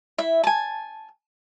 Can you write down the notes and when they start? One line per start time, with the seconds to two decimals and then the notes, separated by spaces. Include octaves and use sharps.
0.18 E4 E5
0.44 G#5 A5